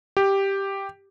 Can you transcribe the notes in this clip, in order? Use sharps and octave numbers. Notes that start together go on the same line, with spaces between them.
G4